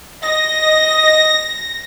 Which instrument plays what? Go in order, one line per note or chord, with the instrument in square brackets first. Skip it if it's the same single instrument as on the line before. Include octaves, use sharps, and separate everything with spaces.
[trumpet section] D#5 [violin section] A#6